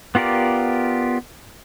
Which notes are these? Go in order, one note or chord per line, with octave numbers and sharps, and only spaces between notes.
B3 F4 G4 A#4 D5